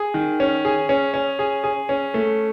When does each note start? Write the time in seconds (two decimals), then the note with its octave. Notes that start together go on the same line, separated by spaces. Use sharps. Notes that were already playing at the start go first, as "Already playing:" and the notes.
Already playing: G#4
0.14 D#3
0.40 C#4
0.65 G#4
0.89 C#4
1.14 C#4
1.39 G#4
1.64 G#4
1.89 C#4
2.14 A3